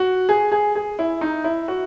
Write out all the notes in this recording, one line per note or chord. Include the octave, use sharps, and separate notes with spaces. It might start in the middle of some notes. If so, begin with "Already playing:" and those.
Already playing: F#4
G#4
G#4
G#4
E4
D#4
E4
F#4